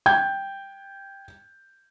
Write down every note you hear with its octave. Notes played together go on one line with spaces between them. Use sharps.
G5 G6 G#6